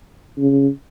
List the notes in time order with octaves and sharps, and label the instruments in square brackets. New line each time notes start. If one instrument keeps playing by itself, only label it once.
[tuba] C#3